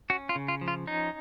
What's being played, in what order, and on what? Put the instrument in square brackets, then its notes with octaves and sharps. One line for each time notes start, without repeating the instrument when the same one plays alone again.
[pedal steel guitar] C#4 F#4
F4
C#3
F4
F3
F4
C#4 D#4